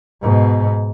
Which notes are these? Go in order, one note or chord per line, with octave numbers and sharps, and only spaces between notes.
G#2 B2